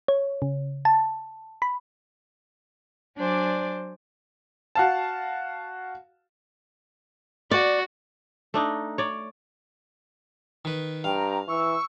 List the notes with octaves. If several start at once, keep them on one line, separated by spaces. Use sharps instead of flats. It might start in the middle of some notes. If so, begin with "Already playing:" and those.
C#5
C#3
A5
B5
F#3 D4 C5 D5 G#5 D6
F#4 F5 A5
F#4 D5
A3 D4 D#4
C#5 D5
D#3 B4
G2 F5 G5 A#5
E3 C#6 E6